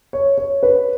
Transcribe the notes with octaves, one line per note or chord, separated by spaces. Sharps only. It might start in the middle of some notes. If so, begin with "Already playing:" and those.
C#5
C#5
B4